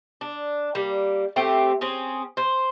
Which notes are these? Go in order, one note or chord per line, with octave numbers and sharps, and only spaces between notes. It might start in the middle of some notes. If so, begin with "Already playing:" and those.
D4
G3 A#3
A3 C4 G4
C4 C#4 G#4
C5